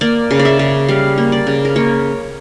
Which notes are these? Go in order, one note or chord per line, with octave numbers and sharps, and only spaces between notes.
A#3 D5
C#3
D5
E5
C#3
G3 F5
A#3
D5
C#3
A#4
A#3 C#5